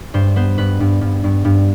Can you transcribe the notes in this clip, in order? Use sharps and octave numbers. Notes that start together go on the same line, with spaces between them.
G2 C5
B3 C5
G2 B4
G2
G2
G2
G2